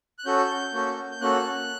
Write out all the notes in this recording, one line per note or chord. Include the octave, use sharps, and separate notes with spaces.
F#6
C#4 F#4 A4 G6
A#3 C#4 F#4 A4
G6
A#3 C#4 F#4 A4 F#6